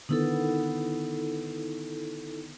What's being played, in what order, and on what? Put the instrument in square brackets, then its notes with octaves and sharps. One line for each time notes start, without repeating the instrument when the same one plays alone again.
[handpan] D3 D#3 B3 [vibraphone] D#4 E4 A4